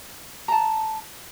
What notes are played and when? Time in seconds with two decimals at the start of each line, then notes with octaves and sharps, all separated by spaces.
0.48 A5 A#5